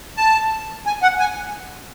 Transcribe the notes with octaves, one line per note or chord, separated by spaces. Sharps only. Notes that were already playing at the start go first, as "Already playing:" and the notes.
A5
G#5
F#5
G#5